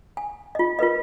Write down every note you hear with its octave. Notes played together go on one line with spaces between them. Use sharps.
G#5
F4 D#5
F4 A#4 B4 D#5